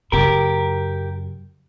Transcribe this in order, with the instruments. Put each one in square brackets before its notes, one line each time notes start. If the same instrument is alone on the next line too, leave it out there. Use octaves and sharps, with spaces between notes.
[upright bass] F#2 C#3 [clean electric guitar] G4 A#4